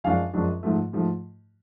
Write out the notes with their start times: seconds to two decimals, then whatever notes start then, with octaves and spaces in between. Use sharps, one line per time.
0.04 F#2 F3 G#3 D4 F5 G#5
0.33 F#2 F3 G#3 D4
0.63 G#2 F3 A3
0.93 G#2 F3 A3